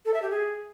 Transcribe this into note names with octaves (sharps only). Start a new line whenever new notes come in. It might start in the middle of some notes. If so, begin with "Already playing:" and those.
A4
E5
G4
G#4